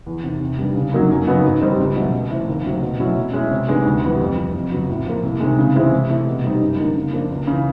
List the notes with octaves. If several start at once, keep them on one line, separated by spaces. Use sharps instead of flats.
E2
C3 D#3
C3
D#3 G3 B3 D4
C#3
F#3 A#3 D#4
F#2
C#3 F#3 B3 D#4
G#2
D#3 G3 C4 D#4
C#2
B2 F#3 A3
C#2
C3 E3 A3 C4
D#2
C#3 F#3 A3 C4
B2
F#3 A3 C#4 E4
B2
G#3 C#4 E4
C3
D#3 G#3 B3 D4
D2
C3 E3 G3 B3
F2
C3 F3
F2
C#3 F#3 B3
A2
F3 A#3
C2
C3 D#3 G#3
C#3
E3 G#3 C4 E4
C3
E3 A3
B2
G3 C4 D#4
F#2
D3 F3 A#3 D#4
C#3
F3 A#3 D4
C#2
C#3 E3